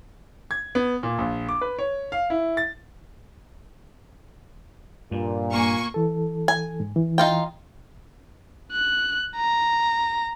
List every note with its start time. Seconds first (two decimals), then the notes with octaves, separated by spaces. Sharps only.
0.51 G#6
0.75 B3
1.03 A#2
1.18 A#1
1.49 D6
1.61 B4
1.79 C#5
2.12 F5
2.30 E4
2.57 A6
5.11 G2 A#2
5.52 A#3 G#5 C#6
5.94 E3 A4
6.48 G#5
6.80 G#2
6.96 E3
7.18 D#4 F4 G5
8.72 F#6
9.37 A#5